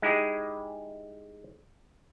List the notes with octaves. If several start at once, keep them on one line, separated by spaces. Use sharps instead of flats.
G#3 D#4 E4 G4 G#4